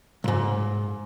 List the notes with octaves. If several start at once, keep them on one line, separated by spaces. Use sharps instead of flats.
B1 G#2